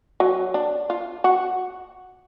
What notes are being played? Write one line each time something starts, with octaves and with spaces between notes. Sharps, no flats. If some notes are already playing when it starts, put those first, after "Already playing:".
F#3
D4
F4
F#4